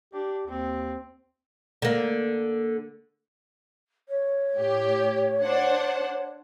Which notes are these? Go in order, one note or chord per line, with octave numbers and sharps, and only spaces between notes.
D4 G4
D#2 C4
D3 A#3
C#5
A2 G4
D4 C5 F#5